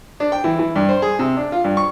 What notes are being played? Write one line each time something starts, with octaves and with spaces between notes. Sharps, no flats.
D4
G5
E3
E3
G2
C5
G#4
C3
D4
F4
G2
C#6